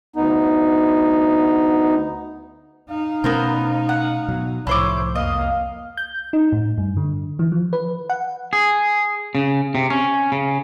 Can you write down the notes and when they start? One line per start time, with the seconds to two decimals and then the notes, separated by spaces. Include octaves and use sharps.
0.16 D2 B3 D#4
2.90 D#4 F5
3.24 B2 A3 B3 C#4 A#4 C5
3.89 F#5
4.28 B2 F#3
4.67 C2 A2 F3 E4 C5 C#5 D6
5.15 F2 A#3 D#5 F5
5.97 G6
6.33 D#4
6.52 A2
6.78 G2
6.97 D3
7.39 E3
7.52 F3
7.73 B4
8.10 F#5
8.53 G#4
9.35 C#3
9.75 C3
9.90 C#4
10.32 C#3